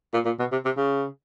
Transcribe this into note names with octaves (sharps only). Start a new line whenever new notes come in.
A#2
A#2
B2
C3
C3
C#3